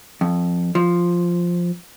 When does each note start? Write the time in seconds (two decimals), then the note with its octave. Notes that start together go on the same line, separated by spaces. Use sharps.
0.21 F2
0.75 F3